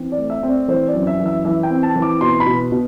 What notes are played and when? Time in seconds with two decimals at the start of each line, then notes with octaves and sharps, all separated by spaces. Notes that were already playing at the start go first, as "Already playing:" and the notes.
Already playing: E3 C4
0.12 D5
0.18 A3
0.30 E5
0.43 C4
0.49 D5
0.68 E3 C5
0.88 D5
0.94 F#2
1.07 E5
1.20 E3
1.26 E5
1.45 E3 E5
1.63 G5
1.70 C4
1.83 A5
1.96 E3
2.02 D6
2.21 B2 C6
2.40 B5
2.46 B2
2.72 B2